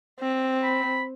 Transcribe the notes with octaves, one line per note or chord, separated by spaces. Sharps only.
C4
B5